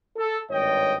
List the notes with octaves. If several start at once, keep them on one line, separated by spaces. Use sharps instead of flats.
A4
G#1 G2 C#5 D#5 G5